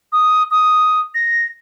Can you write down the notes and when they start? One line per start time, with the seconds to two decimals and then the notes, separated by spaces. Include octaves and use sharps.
0.12 D#6
0.51 D#6
1.15 A#6